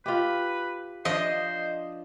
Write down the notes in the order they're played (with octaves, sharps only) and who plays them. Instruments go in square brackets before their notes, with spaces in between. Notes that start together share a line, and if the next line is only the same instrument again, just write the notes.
[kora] F4 G4 [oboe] B4
[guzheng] F3 D4 [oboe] C5 [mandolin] D#5